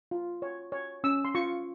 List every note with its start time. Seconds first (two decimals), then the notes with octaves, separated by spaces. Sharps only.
0.11 F4
0.42 C#5
0.72 C#5
1.04 C#4 E6
1.25 C6
1.35 F4 C#6